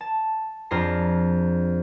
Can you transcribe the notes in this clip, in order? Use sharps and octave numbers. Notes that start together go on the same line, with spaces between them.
A5
F2 D4 F4 G#4 A#5 C7